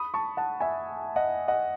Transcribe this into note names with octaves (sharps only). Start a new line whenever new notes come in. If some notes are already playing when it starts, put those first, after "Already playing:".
Already playing: B5 D#6
A5 C#6
F#5 A5
E5 G#5
D#5 F#5
D#5 F#5